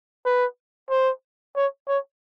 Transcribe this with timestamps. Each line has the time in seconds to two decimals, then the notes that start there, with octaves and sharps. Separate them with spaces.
0.26 B4
0.90 C5
1.56 C#5
1.88 C#5